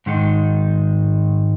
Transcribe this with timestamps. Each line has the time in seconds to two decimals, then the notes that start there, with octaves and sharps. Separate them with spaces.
0.06 G#2 D#3 G#3 D#4